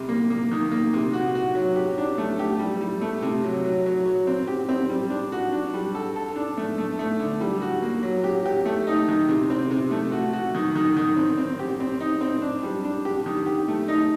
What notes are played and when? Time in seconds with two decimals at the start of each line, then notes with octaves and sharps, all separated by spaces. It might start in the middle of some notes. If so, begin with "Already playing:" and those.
Already playing: C3 G3
0.09 A#3
0.30 A#3
0.52 D#3
0.71 A#3
0.93 C3
1.13 F#4
1.35 F#4
1.55 F#3
1.76 G4
1.98 D4
2.18 A3
2.39 G4
2.59 G3
2.81 G3
3.01 A3
3.22 C3
3.44 F#3
3.64 F#3
3.86 F#3
4.06 F#3
4.27 C4
4.47 G4
4.69 C4
4.89 G3
5.10 D4
5.32 F#4
5.52 D4
5.74 G3
5.95 A4
6.16 A4
6.36 D4
6.57 A3
6.78 A3
6.99 A3
7.19 D3
7.41 G3
7.62 F#4
7.82 A#3
8.03 F#3
8.24 G4
8.46 G4
8.65 A3
8.87 D#4
9.08 D#3
9.28 C3
9.50 C4
9.71 C3
9.91 A3
10.12 F#4
10.33 F#4
10.55 D#3
10.76 D#3
10.97 D#3
11.16 C4
11.37 C4
11.59 G4
11.80 C4
12.00 D#4
12.21 C4
12.42 D4
12.63 G3
12.85 D4
13.05 G4
13.26 D#3
13.46 G4
13.68 A3
13.88 D#4